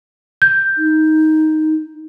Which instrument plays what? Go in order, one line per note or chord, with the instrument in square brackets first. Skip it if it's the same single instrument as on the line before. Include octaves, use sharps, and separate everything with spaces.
[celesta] G6
[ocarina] D#4